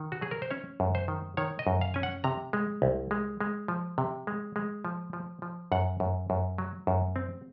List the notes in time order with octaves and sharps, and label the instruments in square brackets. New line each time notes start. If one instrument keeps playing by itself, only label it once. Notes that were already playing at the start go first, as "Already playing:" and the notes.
Already playing: [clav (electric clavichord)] D#3
F#4
F#3 G#4
A#4
C5
C#4 C#5
F#2
C5
D#3
D#3 C#5
D#5
F#2
F5
C#4 G#5
F#5
C3 A#5
G#3
C2
G#3
G#3
F3
C3
G#3
G#3
F3
F3
F3
F#2 F#5
F#2
F#2
F#3
F#2
C4